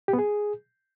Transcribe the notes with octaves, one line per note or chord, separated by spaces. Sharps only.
G4
B3
G#4